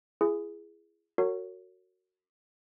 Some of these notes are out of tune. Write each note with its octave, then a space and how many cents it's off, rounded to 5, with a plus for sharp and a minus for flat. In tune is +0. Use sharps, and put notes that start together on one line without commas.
E4 +35 G#4 +0
F#4 +0 A#4 -35 C#5 +0